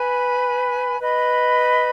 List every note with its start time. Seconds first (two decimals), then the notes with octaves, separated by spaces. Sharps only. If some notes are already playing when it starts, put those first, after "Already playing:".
Already playing: B4 G#5 B5
0.99 B4 D#5 B5